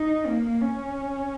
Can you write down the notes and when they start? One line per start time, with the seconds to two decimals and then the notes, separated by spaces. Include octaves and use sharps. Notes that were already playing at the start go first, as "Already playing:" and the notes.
Already playing: D#4
0.26 A#3
0.61 C#4